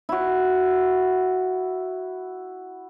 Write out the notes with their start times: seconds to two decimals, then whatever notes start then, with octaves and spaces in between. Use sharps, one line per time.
0.09 E4 F#4